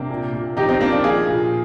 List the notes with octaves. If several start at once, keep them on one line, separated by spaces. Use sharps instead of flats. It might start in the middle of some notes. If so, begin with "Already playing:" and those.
Already playing: C3 A#3 D4
A#2
A#2
F3 D#4 G4
C4 D#4
F3 A#3 D4
D4 F4
F3 F4 G#4
A#2